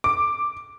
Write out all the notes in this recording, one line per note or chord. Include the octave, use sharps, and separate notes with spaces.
D6